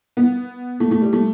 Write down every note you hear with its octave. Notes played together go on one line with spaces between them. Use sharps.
B3
A3
A3
G3
A3